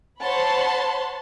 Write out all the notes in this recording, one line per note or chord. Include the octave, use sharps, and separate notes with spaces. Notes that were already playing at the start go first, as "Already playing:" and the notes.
C5 C#5 F#5 A5 B5 C6